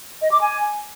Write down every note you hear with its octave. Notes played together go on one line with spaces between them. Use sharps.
D#5
D6
G#5